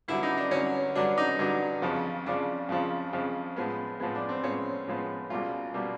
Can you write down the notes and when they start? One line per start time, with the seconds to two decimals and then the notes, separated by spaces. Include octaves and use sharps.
0.08 G2 D3 F#3 E4
0.23 D#4
0.38 D4
0.51 G2 D3 F#3 C#4
0.95 G2 D3 F#3 D4
1.18 D#4
1.39 G2 D3 F#3 D4
1.82 F2 C#3 F3
2.26 F2 C#3 F3 D4
2.69 F2 C#3 F3
3.13 F2 C#3 F3
3.56 A2 F3 G#3 B3
4.00 A2 F3 G#3 B3
4.15 D4
4.29 C4
4.43 A2 F3 G#3 B3 C#4
4.87 A2 F3 G#3 B3
5.30 C#2 B2 G3 A#3 F4
5.74 B2 G3 A#3